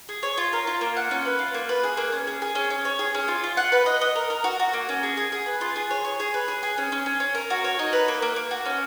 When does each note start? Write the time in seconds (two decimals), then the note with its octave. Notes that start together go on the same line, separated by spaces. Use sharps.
0.09 G#4
0.23 C#5
0.38 F4
0.53 A#4
0.67 F4
0.81 A#3
0.97 F#5
1.11 C#4
1.25 B4
1.39 F4
1.54 A#3
1.69 B4
1.83 G#4
1.97 A#3
2.12 C#4
2.27 G#4
2.42 G#4
2.55 C#4
2.70 C#4
2.85 C#5
2.99 G#4
3.14 C#4
3.28 F4
3.43 F4
3.57 F#5
3.72 B4
3.86 D#5
4.01 D#5
4.15 A#4
4.30 A#4
4.44 F#4
4.59 F#4
4.73 A#3
4.89 C#4
5.03 G#4
5.17 G#4
5.32 G#4
5.46 B4
5.61 F4
5.76 G#4
5.90 C#5
6.04 C#5
6.20 G#4
6.34 B4
6.48 G#4
6.63 G#4
6.78 C#4
6.92 C#4
7.06 C#4
7.20 C#4
7.35 A#4
7.50 F#4
7.64 C#5
7.79 D#4
7.93 B4
8.08 A#3
8.22 A#3
8.36 A#3
8.51 F#4
8.65 C#4